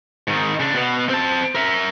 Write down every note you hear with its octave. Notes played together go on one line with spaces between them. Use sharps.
G#2 D#3
C#3 D4
B2 B3
C4 A5
A#4 E5